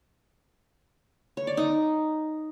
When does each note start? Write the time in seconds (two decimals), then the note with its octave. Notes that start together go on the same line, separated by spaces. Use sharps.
1.37 C#5
1.47 D5
1.57 D#4